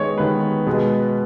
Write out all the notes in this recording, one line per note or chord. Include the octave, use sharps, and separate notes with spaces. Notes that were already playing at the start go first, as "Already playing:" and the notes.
Already playing: D#3 G#3 B3 C#5 D#5
D#3 G#3 B3 B4
B2 G#3 B3